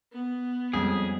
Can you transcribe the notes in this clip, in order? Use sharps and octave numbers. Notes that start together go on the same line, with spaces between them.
B3
F2 G3 G#3 C#4 G#4